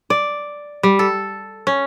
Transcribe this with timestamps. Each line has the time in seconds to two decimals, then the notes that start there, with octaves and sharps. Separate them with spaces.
0.10 D5
0.83 G3
0.99 A4
1.67 C#4